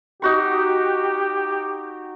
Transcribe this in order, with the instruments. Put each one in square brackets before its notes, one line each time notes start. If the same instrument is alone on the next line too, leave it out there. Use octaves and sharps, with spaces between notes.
[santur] D#4 F#4 C#6 [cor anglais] G4